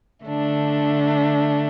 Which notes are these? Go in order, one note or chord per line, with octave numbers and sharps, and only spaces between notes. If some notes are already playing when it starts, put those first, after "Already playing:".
D3 A3 D4